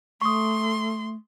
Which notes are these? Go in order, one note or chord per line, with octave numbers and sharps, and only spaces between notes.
A3 C6 C#6 D#6